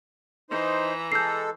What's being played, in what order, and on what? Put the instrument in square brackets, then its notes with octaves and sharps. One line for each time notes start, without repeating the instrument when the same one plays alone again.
[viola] E3 A#5 [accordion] D#4 C5
[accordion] G#3 A4 [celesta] G6 C7